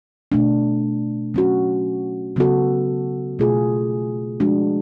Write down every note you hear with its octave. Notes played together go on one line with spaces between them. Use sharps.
B2 A3 D4
F#3 C#4 F#4
C#3 F#3 B3 F#4 A4
B2 A3 F4 G#4
F3 G#3 D4 F#4